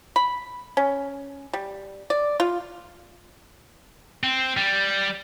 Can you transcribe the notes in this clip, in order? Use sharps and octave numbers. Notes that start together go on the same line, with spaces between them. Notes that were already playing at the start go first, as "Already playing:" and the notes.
B5
C#4
G3
D5
F4
C4
G3